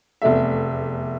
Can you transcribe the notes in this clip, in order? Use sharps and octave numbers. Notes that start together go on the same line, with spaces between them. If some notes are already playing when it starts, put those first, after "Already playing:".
F1 E2 A3 E5